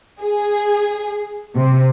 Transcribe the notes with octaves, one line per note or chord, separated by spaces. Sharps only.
G#4
C3